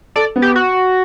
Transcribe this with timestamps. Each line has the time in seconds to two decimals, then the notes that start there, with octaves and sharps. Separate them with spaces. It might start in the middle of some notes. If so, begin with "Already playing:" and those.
0.16 A4 D5
0.36 B3
0.42 G4
0.56 F#4